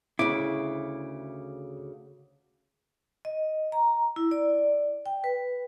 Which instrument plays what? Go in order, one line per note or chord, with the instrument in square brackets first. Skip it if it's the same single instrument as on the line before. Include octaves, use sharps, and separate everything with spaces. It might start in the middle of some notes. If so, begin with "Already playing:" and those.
[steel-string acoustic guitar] D2 C#3 [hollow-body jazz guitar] E4 [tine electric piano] D6
[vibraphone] D#5
A#5
E4
D5
G5
B4